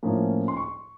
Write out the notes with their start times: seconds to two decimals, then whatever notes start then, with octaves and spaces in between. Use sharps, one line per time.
0.03 A2 F3 A#3 C#4
0.48 C6
0.57 C#6